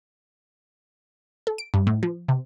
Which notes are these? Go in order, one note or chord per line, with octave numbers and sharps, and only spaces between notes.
A4
D7
G2
A2
F3
C3